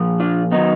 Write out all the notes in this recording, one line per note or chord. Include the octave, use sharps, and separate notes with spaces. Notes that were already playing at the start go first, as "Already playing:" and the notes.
Already playing: A#2 F3
D4 F4
D#3 F#3 B3 D#4